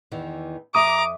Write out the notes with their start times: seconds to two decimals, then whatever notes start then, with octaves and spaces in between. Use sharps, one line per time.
0.11 E2 D#3 E3
0.75 F2 E5 A#5 D6 D#6